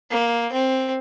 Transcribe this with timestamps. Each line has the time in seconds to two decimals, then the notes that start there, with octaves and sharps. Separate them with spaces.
0.11 A#3
0.53 C4